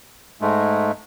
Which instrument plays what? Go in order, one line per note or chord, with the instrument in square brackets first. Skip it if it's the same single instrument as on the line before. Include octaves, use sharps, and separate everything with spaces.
[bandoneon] G#2 G#3 A3